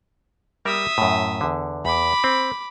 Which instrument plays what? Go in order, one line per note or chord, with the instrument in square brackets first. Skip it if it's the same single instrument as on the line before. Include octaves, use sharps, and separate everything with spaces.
[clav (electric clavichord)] G3 A#4 [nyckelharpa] E5 D#6
[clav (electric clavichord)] F#2 A2
E2 D3
[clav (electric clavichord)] E2 [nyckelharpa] B5 D6
[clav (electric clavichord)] C4